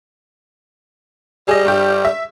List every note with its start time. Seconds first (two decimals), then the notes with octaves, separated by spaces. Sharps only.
1.48 G3 G#4 D#5
1.66 G2 G4
2.05 E5